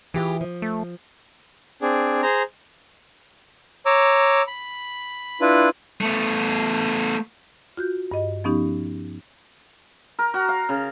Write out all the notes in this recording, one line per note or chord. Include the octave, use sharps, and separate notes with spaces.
E3 F4 G4 G#4
F3
A3
C4 D4 G#4
G#4 C5 A#5
C#5 A#5 D6 E6
B5
D4 E4 F4 B4
A3 B3
F4 F#4 G6
G2 D#5
F3 B3 C#4 D#4 G4
A#4
F#4
F5
C#3